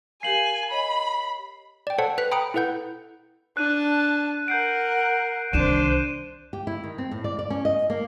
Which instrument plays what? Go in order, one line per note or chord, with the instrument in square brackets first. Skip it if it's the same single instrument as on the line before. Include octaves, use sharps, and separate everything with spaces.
[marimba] G4 A#4 F5 [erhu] G#5 [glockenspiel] C7 F#7
[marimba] C#5 D#5 [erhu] B5
[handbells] D5 G5
A4 C5 C#5 F#5 A5
B4 F#6 B6
G5 A#5 B5 D#6 C#7 D7
E4 A4 B4 F#5 G6
[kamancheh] D4 A5 [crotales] F#6 D#7
[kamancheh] A#4 F#5 [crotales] G6 C7 D7
[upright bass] C2 D#3 [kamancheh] D4 C5 [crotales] D#7 E7
[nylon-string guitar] G4
E4
D#3
C4
A2
D5
D5
C#4
D#5
A#3